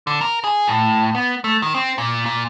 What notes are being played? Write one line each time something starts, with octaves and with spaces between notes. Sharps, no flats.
D3
A#4
G#4
A2
B3
A3
D#3
C4
A#2
A#2